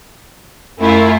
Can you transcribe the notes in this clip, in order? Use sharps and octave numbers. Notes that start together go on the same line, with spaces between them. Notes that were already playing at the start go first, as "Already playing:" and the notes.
F#2 A3 E4 F4